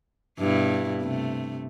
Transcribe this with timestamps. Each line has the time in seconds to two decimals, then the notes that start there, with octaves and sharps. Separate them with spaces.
0.39 G2 B2 E4
1.02 C3 A3